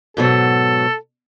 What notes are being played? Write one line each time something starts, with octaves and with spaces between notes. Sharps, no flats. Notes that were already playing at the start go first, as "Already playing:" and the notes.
G#2 B2 F#3 A4